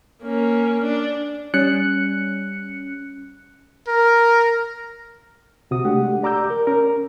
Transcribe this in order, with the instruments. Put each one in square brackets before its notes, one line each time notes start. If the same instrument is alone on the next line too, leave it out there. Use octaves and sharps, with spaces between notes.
[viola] A#3 C#4
D4
[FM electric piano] G3 C#4 F#6 C#7
[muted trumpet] A#4
[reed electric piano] C2 C3 F#4 D#6
G#3 A3 D4 G4 F#5
G4 D5 A#5 D6 E6 G6
A#4
C#4 A#4